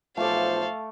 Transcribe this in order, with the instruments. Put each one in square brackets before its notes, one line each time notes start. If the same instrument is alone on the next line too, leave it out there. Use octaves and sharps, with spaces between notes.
[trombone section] B1 C5 [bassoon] F3 [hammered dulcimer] A3 D6 [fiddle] A4 F5